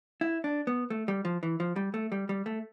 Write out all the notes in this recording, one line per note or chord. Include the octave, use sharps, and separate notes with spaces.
E4
D4
B3
A3
G3
F3
E3
F3
G3
A3
G3
G3
A3